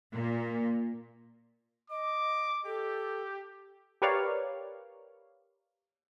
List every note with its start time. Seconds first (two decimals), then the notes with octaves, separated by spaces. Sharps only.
0.14 A#2 A#3
1.90 D#5 D6
2.66 G4 A4
4.02 G4 A#4 B4 C#5 D5 F5